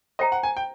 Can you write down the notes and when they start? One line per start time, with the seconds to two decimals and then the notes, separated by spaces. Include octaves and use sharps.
0.19 C5 D#5 E5 G5 A#5
0.32 F#5
0.43 G#5
0.57 G5